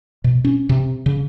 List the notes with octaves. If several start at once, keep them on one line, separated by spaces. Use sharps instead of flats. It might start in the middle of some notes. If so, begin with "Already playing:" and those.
B2
C#4
C3
C#3